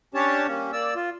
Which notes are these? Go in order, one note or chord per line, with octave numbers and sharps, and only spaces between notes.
C#4 D4 G4 C#5 A5
G3 A#3 C#4
A#3 D5 E6
F4